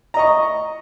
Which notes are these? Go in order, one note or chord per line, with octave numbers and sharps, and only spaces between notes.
D#5 A#5 C#6